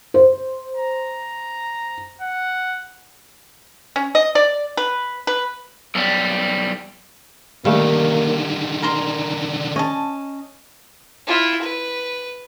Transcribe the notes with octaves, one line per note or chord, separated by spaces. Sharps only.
C5
A#5
F#5
C#4
D#5
D5
B4
B4
B1 G3
D3 D#3 G3 A3 A#3 F5
D4 A#4 A#5 C6
C#4 D#5 A5
E4 F4
B4